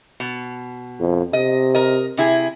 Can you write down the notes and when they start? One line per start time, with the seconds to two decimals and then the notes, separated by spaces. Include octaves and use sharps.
0.20 B2
1.00 F2
1.33 C3 D#5
1.75 A#4 D#5
2.17 C3 E4 G#4